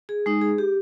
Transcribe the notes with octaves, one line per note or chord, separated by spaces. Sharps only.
G#4
G#3 D#4
G#4
G4